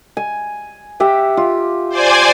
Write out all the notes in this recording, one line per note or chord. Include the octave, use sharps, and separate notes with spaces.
G#5
G4 E5 F#5
F4
C5 D5 G#5